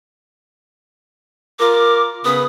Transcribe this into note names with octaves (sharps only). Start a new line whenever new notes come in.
F4 A#4 D6
C#3 B3 B4 D#6